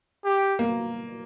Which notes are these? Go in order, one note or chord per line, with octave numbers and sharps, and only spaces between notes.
G4
A#3